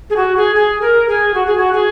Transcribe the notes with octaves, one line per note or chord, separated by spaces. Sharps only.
G#4
F#4
G#4
G#4
A#4
G#4
F#4
G#4
F#4
G#4